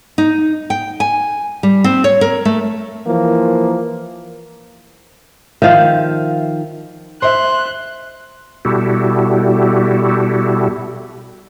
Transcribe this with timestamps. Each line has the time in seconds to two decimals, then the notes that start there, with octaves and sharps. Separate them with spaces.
0.18 D#4
0.70 G5
1.00 G#5
1.63 G3
1.84 C4
2.04 C#5
2.21 A#4
2.45 A3
3.07 E3 F3 A#3
5.62 D#3 F3 E5 F5
7.22 C5 E5 C6 F#6
8.65 B2 G3 E4 F#4 G4 A4